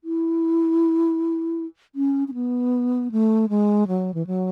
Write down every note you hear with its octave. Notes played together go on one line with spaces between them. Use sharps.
E4
C#4
C#4
B3
A3
G#3
F#3
E3
F#3